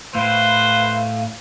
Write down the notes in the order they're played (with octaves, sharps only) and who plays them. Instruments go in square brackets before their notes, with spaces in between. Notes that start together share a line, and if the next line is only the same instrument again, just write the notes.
[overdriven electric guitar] A2 [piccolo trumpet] B4 [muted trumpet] C5 [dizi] F5